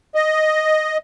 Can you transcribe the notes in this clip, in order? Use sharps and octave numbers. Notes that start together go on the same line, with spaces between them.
D#5